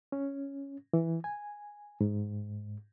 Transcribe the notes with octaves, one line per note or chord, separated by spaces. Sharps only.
C#4
E3
G#5
G#2